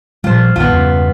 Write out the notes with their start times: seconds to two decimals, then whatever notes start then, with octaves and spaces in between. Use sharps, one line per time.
0.24 A#2 F3 G3 F4 C5
0.56 A#1 G2 D#3 B3 F4
0.72 E2 G2 C#3